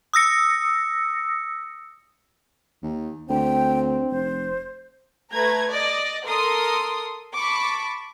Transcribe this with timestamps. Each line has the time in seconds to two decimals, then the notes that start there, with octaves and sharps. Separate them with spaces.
0.14 D#6 E6 A#6 C#7
2.83 D#2
3.29 D2 C4 G5
4.10 F1 C5
5.33 A3 B4 A#5 G#6
5.70 D5 D#5
6.26 A4 A#4 C6 D#6
7.35 A5 B5 C#6 D6